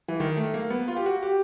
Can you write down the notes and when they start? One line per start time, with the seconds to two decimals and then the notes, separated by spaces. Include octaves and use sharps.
0.08 E3
0.20 D#3
0.37 A3
0.54 A#3
0.70 B3
0.88 F4
0.97 G4
1.06 F#4
1.23 G4